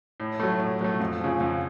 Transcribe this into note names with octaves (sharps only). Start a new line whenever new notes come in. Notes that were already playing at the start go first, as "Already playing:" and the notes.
A2
F#3 A3
A2
F#3 A3
F2
C#3 F3
F2